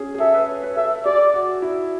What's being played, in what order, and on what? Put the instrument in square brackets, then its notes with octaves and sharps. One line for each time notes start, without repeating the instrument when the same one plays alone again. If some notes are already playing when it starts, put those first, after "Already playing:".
Already playing: [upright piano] C#4 G#4
G#4
[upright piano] A4 [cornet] E5
[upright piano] B4
C#5
B4
[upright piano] A4 [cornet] E5
[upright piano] G#4 [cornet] D5
[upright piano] F#4
E4